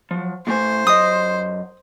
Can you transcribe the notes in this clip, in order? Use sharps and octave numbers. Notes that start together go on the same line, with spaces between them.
F3 F#3
A2 A3 C5 G#5
F#2 D#5 D#6